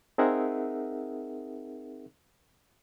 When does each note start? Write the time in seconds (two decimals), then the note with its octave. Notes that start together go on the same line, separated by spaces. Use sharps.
0.18 C4 D#4 G#4 A#4 E5 F#5